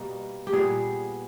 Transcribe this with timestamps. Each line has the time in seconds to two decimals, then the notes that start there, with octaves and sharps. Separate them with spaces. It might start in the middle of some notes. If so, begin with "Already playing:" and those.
Already playing: B2 G3 A#3
0.47 G4
0.52 A#2 G3 B3 G#4